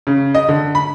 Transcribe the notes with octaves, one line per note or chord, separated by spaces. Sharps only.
C#3
D#5
D3
B5